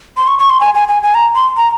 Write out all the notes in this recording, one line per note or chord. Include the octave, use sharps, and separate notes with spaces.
C6
C#6
C#6
C6
G#5
G#5
G#5
G#5
A#5
C6
A#5